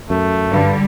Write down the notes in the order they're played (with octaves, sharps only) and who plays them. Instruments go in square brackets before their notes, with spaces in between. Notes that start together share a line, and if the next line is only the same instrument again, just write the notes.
[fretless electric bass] F#2 [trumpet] A3
[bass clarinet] G2 [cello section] D3 G3